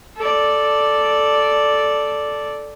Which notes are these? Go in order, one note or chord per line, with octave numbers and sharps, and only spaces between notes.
A4 D5